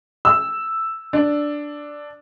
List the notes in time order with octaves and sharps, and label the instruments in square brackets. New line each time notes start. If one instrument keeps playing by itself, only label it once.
[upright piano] E6
D4